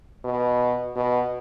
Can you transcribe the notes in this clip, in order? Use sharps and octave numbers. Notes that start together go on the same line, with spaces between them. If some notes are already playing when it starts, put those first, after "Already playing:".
B2
B2